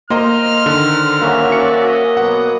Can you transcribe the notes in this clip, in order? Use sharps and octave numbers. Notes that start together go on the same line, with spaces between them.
A#3 C5 D#5 A#5 F6
D3 D#3
A#3 C#4 F#4 E5
D5 C#7
D#5
B2 F#3 B3 F#5